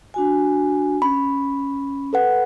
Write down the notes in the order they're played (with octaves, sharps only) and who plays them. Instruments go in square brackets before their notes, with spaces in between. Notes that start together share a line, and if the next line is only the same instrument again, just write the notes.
[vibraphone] D4 F#4 G#5
[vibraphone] C#4 [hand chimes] B5
[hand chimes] A4 B4 F#5